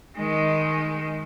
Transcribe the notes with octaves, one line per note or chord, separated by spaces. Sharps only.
D#3 G#3